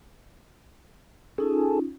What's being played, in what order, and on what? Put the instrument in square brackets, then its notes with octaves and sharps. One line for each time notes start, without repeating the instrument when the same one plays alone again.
[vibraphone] C#4 D#4 F4 [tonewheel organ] G#4 A4